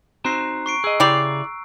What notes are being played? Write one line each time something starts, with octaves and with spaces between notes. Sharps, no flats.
C4 D#4 F#4 A#5 F#6 C7
C#6 C7 D7
G#4 D#5 E6
C#3 E4 G4 G#4 D5 A#5